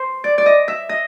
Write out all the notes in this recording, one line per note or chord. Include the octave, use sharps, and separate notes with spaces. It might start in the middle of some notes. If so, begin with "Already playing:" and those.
Already playing: C5
D5
D5
D#5
E5
D#5